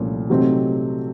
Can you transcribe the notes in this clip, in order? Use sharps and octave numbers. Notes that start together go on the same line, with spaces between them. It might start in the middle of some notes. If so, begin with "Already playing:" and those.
Already playing: C2 A#2 F3 A3 C#4
C3 F#3 A3 C4 D#4